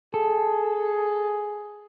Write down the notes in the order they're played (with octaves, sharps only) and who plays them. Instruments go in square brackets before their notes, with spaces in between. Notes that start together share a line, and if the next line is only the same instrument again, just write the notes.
[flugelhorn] G#4 [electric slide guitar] A4